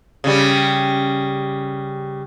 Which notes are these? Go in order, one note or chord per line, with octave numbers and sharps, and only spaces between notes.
C#3 G3